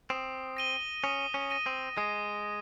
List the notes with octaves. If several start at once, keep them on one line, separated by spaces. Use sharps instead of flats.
C4 D#6
A#6 D#7 G7
C#4 D#6
C#4
A#6 D#7 G7
C4
G#3 D#6